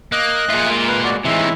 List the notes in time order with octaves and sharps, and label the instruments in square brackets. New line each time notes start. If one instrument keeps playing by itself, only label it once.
[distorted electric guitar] A#3 [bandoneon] D#5 F#6
[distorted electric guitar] A#2 F4 [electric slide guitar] G#4 E5
[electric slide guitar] G#3 A#3
[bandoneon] B4
F#4 D5
[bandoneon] A2 G#3 E5 [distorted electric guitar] C3 D#3 [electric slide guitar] E3